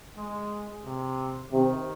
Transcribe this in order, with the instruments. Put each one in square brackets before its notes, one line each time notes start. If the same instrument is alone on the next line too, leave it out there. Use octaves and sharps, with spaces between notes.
[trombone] G#3
C3
[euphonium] C3 [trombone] D#3